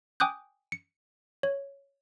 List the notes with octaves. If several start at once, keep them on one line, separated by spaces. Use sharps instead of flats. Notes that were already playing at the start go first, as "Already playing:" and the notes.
G5 G#5 D6 D#6 F#6 G6
C#7
C#5